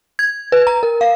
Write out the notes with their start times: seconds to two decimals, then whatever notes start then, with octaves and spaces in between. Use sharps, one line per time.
0.19 G#6
0.52 B4
0.67 A#5
0.83 A#4
1.01 F5